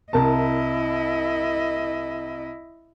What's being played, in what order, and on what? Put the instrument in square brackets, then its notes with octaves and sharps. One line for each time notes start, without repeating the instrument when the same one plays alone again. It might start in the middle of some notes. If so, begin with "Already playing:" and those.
[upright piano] C2 A#4 A5 [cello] E4 D#5